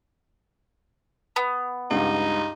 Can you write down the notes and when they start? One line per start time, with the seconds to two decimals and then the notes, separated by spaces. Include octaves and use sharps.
1.36 B3
1.91 C#2 G2 D#4